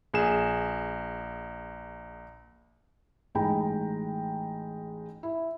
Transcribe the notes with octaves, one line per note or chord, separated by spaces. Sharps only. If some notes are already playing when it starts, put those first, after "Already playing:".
A#1 G#4 E7
A1 G#3 D#4 G5 A#5 B5
E4